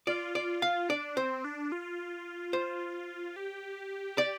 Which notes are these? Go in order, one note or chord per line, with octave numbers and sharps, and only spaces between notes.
F4 D5
D5
F5
D4 D5
C4 C5
D4
F4
C5
G4
D5